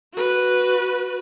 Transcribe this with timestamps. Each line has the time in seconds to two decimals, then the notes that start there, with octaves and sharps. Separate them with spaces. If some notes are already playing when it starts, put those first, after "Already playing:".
0.13 F#4 B4